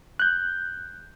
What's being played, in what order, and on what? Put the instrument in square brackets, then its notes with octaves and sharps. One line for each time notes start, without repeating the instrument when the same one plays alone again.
[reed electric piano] F#6 G6